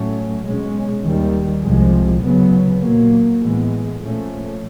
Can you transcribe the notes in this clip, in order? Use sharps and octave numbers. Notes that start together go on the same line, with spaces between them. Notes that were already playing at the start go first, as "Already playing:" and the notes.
Already playing: A2 F#3 A3 C#4
B2 G#3 C#4
D#2 D#3 G3
C2 C3 F3 G#3
D2 C#3 F#3 B3
A#2 F#3 A#3
A2 E3 G#3 B3
A#2 F3 A3 C#4